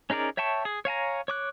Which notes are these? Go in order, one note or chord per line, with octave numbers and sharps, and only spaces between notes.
C#4 D#4 G#4 A#4 D5
C#5 E5 G5 A5 C#6
G#4
C#5 F5 G#5 A#5
C#5 D6 F#6